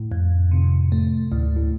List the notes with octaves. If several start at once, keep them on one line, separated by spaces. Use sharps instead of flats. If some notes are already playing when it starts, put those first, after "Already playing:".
Already playing: A2
F2
C3
A3
D2 A2
A2